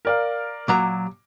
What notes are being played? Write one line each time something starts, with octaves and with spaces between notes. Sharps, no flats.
A#4 D5 F5
A#2 F#3 A#5 D6